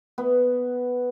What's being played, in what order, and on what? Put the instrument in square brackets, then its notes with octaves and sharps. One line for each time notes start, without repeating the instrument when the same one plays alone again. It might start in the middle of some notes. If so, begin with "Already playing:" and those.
[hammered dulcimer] B3